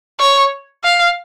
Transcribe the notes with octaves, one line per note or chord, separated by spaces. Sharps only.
C#5
F5